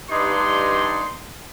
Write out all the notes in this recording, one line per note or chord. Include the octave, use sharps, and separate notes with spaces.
G2 D#4 C6